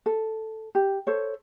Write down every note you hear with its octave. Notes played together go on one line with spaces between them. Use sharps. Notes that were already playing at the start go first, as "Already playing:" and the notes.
A4
G4
A4 C5 C#5